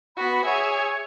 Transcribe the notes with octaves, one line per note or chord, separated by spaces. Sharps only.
B3 F#4 B5
G#4 C#5 E5